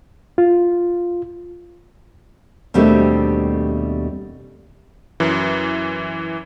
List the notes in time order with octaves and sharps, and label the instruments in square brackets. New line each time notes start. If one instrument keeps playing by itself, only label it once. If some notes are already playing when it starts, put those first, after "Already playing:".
[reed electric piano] F4
[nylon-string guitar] D#2 B2 G3 A3 C4 D4
[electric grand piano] F#2 E3